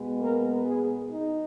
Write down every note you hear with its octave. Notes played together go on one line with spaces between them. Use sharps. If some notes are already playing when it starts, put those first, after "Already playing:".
Already playing: B2 G#3 B3
A#3 A#4
G#3 G#4
D#4